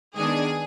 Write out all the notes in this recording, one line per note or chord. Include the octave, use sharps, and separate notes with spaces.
D#3 G#3 B3 D4 G#4